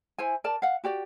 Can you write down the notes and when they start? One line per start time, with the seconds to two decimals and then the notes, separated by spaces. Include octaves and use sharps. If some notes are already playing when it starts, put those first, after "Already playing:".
0.18 E4 C5 G#5
0.44 A#4 D5 A5
0.62 F5 F#5
0.84 F#4 G4 D5